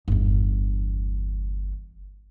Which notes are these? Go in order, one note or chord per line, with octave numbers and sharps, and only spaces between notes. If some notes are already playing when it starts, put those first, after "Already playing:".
G1 E2